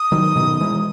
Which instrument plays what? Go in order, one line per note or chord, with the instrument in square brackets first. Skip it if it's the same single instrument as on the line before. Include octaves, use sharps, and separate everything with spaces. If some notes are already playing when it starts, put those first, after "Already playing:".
Already playing: [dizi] D#6
[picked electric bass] D#3 F#3
B2 D#3
E3 G#3